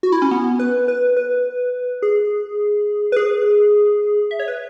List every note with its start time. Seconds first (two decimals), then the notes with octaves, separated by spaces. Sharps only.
0.03 F#4
0.12 E4
0.22 C#4
0.31 B3
0.59 B4
0.88 B4
1.17 B4
2.02 G#4
3.12 B4
3.17 G#4
4.31 E5
4.40 C#5
4.48 B4